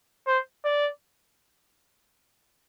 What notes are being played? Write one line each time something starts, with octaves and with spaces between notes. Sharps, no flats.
C5
D5